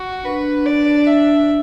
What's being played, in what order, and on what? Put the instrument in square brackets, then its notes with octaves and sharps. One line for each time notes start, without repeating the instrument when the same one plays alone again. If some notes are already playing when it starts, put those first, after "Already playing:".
Already playing: [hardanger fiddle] F#4
[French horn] D4 [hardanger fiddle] B4
[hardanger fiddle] D5
E5